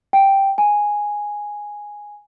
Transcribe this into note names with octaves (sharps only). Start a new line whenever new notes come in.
G5
G#5